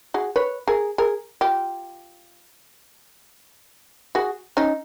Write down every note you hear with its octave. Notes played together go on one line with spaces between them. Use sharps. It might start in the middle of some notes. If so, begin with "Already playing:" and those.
F#4 G#4
B4 C#5
G#4 A#4
G#4 A#4
F4 G4
F#4 G#4
C#4 D#4